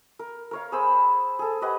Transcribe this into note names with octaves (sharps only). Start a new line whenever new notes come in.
A#4
A#4 C#5 F5
G#4 C5 B5 E6
G#4 A4
G4 B4 D#5 F#5